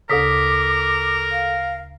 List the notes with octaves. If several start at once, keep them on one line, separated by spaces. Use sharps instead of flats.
D2 C#3 A4 A#4 D6 D#6 B6
F5